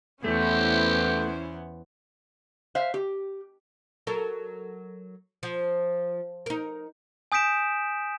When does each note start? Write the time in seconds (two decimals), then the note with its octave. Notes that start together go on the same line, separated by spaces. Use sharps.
0.24 E2 A3 B3 C#4 E4 G4 C5
2.75 C5 E5 F5
2.94 G4
4.07 F#3 A4 A#4
5.43 F3
6.46 D#4 A#4
7.32 G#5 D#6 G6 B6 D7 E7